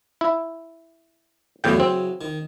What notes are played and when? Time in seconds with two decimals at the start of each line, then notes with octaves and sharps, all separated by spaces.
0.21 E4
1.64 E2 A2 C#3 E3 F#3 G5
1.80 C4
2.21 D#3